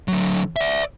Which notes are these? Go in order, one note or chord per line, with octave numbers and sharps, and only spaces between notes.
D3 F#3
D5 E5